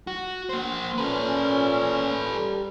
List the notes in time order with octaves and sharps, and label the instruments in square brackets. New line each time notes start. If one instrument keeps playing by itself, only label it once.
[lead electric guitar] F#4
A#3 C5
[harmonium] A#2 C#4 [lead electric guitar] A4 B4
[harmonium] G3